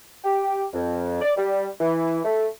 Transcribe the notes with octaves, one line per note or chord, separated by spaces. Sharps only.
G4
F2
D5
G3
E3
A3